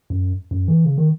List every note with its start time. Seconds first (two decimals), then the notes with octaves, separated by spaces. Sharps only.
0.10 F#2
0.51 F#2
0.68 E3
0.85 C#3
0.98 D#3